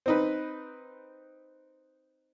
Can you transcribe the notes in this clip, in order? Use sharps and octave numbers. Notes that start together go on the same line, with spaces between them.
C4 D#4 B4